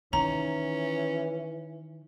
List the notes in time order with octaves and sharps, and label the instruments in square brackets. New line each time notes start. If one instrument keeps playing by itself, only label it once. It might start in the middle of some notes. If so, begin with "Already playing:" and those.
[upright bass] D#3 [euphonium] E3 [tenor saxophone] C#4 [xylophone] A#5